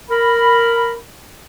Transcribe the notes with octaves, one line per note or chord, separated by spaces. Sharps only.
A#4 B5